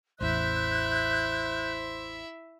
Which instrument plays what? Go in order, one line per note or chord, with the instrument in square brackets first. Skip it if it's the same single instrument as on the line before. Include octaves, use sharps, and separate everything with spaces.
[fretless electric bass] A1 E2 [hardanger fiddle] E4 E5 [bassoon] C5 [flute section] F#6 G6